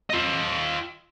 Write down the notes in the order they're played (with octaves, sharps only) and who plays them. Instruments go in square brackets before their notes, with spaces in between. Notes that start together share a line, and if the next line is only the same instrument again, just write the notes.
[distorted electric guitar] F4 D#5